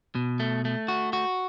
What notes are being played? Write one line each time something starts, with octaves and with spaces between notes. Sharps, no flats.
B2
A3
A3
F#4
F#4